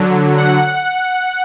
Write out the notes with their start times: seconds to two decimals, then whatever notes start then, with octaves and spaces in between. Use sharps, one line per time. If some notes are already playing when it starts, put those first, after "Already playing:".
Already playing: D3 F#3
0.37 F#5